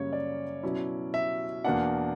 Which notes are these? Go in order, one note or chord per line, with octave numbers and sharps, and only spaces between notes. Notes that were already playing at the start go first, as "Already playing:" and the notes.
Already playing: F#2 C#3 G3 A#3 C#4 C#5
D5
B2 F#3 C#4 E4
E5
E2 B2 A#3 D4 F#5